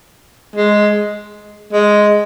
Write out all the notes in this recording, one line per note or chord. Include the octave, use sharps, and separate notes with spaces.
G#3
G#3